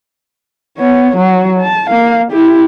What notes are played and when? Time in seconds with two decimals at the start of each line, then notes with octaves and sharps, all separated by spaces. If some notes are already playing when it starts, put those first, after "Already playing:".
0.78 B3 C#5
1.17 F#3 F#4
1.60 A5
1.90 A#3 F5
2.32 E4 G4